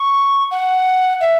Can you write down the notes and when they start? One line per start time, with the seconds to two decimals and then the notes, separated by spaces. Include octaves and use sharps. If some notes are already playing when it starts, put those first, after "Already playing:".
Already playing: C#6
0.51 F#5
1.20 E5